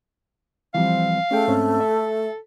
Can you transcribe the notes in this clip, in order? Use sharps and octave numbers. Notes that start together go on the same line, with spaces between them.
E3 F3 G3 C4 F5
A3 C#4 G#4 G5
G#2 C4 C#4
A4 E5